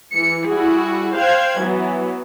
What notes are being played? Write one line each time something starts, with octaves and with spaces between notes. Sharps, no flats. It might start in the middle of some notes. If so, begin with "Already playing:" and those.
E3 C#7
G3 E4 F#4 G#4
C5 F5 G5 F#6 G#6
E3 F#3 B3